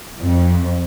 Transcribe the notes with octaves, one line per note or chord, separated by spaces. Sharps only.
F2